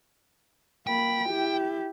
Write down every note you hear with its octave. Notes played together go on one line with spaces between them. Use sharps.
A#3 G5 B5
E4 G4